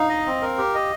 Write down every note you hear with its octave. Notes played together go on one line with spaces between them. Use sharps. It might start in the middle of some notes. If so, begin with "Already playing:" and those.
Already playing: D#4 F5
D#5
C4
A#4
G4
D#5